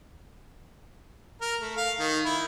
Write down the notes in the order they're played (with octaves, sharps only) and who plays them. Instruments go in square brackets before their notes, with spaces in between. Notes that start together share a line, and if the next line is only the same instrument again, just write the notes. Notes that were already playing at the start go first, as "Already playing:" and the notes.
[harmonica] A#4
A3
F5
D#3
E4